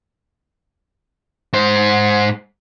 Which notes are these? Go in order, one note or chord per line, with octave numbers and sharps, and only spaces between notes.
G#2 C5